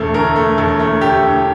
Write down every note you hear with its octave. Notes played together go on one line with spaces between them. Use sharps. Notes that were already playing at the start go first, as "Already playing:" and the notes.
Already playing: E1 A3 A4
D2 A#4
A3
E1 A4
A3
D2 G4
D2